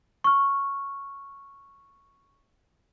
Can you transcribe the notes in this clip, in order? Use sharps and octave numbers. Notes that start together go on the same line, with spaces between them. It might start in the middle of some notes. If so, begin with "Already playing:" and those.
C#6 F6